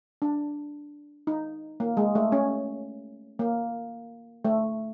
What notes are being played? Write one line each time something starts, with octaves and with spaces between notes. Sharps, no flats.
D4
D#4
A#3
G#3
A3
C#4
A#3
A3